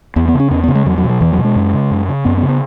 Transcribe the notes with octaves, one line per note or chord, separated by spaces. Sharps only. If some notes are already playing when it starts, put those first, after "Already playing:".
E2 B3
B3
C#3
C#4
E2 C#4
B3
C#3
G#3
E2 F#3
F#3
B2
F#3
E2 E3
F#3
B2
G#3
F#2
C#3
F#2
C#3
F#2 B3
B3
C#3
B3